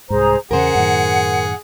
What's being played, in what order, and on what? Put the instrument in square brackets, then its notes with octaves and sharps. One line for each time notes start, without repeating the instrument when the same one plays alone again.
[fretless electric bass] C2 G#2 [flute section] G#4 C5 A#5
[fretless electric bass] E2 C#3 [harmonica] G#4 [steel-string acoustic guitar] A#4 C5 [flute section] F#5
[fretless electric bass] F#2 A2 D#3